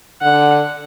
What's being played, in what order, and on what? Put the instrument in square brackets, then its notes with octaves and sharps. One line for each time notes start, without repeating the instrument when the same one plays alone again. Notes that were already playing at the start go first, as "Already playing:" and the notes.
[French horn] D3 [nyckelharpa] F#5